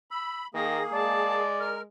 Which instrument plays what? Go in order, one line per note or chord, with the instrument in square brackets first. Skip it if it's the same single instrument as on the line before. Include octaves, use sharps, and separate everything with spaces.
[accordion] B5 [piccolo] E6
[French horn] D#3 [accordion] A#3 G#4 [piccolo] A#6
[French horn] G#3 [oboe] D5 [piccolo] A5
[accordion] A#4 [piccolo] F6